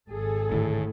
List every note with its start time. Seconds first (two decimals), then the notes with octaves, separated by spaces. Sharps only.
0.11 G#1 G#4 A4
0.52 D1 A2 D3 D#3